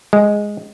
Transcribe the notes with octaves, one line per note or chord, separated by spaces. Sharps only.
G#3